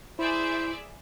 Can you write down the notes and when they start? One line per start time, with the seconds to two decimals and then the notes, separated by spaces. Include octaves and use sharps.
0.19 E4 G#4 C5 D5 E5